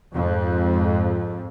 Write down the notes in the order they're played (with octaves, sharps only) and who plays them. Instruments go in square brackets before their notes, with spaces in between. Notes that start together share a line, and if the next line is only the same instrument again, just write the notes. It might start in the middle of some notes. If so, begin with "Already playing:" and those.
[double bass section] F2 G#2